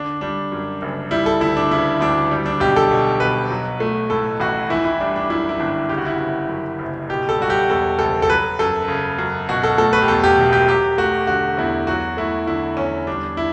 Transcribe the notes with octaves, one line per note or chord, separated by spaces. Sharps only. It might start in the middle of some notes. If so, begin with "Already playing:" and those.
Already playing: D3 D4
G3 D4
F#2
F#1
G3 E4
A4
D2 E4
D4
C#3 E4
D2 D4
G3
D4
B1 G4
A4
B2
B1 B4
F#3
A3
A2 A4
A1 F#4
E3 E4
E4
G3 D4
D4
F#2 E4
E4
G1 D4
C#3 G4
F#4
E4
F#1 F#4
F#2
F#1
B2 G4
A4
G3 F#4
G4
E2 A4
F#1 A4
A4
F#3 B4
F#2 A4
C#3
F#2
B2 F#4
A4
A3 A4
B4
G4
E2 A4
G4
E1
G4
F#3 G4
A3 F#4
D3 F#4
E2 E4
F#3 F#4
A3 E4
D3 E4
E2 C#4
G3 D4
E4